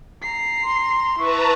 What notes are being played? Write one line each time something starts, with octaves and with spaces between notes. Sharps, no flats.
A#5 C7
C6
E4 B4 A5 A#5 C#6